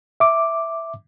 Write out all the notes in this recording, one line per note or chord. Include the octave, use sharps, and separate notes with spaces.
E5 D6